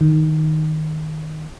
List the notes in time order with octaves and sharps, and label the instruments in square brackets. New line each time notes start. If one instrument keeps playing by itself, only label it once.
[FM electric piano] D#3